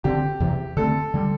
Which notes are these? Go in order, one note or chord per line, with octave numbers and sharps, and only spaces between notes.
D3 C4 G4
E2 C3 E3
D3 A3 C4 A4
D3 G3